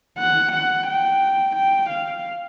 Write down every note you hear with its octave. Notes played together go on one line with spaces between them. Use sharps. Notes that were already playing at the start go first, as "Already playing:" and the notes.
F#5
F#5
G5
G5
F5